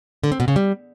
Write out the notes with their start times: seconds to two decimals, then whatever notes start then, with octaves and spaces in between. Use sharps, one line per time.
0.23 D3
0.32 C4
0.40 B2
0.48 C#3
0.56 G3